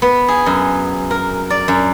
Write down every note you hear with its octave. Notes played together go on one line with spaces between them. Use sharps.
B3
G#4
F#2
A#4
D5
F#2